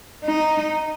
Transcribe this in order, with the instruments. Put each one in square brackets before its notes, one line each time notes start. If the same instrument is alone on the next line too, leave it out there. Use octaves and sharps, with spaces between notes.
[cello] D#4